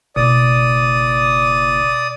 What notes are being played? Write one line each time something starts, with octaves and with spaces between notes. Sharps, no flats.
F#1 B2 D5 D#6